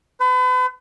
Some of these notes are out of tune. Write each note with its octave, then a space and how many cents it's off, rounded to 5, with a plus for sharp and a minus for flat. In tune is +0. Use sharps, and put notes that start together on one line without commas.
B4 +40